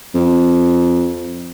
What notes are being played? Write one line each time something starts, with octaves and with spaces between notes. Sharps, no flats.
F2